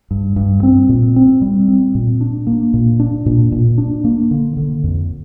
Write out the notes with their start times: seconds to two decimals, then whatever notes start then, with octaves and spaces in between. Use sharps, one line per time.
0.11 G2
0.36 G2
0.63 C4
0.89 A#2
1.16 C4
1.42 G3
1.68 C4
1.95 A#2
2.21 D4
2.47 A#3
2.74 A#2
3.00 D4
3.26 A#2
3.52 A#2
3.78 D4
4.04 A#3
4.31 D3
4.57 D3
4.84 F2